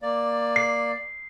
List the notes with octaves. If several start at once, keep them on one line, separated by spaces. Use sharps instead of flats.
A#3 D5
C7